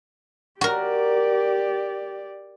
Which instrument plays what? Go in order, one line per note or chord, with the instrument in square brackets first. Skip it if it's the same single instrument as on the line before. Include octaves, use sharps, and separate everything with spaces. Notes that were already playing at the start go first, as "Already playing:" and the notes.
[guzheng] F#4 A#4 [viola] G4 D5